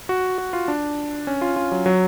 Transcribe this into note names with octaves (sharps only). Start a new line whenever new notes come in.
F#4
F#4
F4
D4
C#4
F4
F4
F#3
F#3